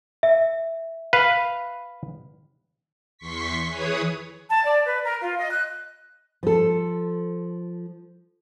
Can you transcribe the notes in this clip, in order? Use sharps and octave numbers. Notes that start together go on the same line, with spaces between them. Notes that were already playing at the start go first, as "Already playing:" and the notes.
E5
B4 F5
E2 C6 C#6 B6
E3 G#4 B4 C#5 D#6
A5
D5
B4
A#4
F4
D#5
F#6
F3 A4